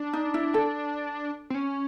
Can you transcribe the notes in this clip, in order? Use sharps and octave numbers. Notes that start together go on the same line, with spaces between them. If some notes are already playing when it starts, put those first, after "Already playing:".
Already playing: D4
D#4
E4
A4
C4
C#4